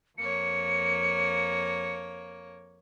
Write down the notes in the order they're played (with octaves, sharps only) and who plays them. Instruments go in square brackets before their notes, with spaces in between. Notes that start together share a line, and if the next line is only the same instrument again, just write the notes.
[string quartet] F2 A#3 C#5 [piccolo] C#7